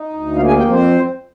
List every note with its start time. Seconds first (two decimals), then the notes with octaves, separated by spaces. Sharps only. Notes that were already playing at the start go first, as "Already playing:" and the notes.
Already playing: D#4
0.13 D2
0.36 A#3 F4 F5
0.47 G#4 G#5
0.58 F2 G4 G5
0.69 C4 C5